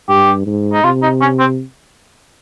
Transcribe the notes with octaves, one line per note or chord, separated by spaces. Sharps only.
G2 G4
G#2
D#4
C3 F4
D#4
C#4
C4